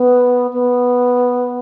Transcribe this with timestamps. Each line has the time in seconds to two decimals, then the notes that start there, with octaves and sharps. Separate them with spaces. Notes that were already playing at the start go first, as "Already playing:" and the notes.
Already playing: B3
0.53 B3